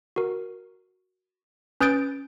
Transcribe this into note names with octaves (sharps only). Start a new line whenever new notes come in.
F#4 A#4
C#4 B4 D#6 G6 A6 D7